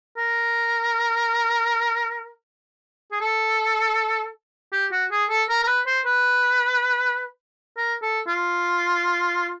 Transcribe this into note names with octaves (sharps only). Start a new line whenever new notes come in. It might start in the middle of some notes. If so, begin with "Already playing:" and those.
A#4
G#4
A4
G4
F#4
G#4
A4
A#4
A#4
B4
C5
B4
A#4
A4
F4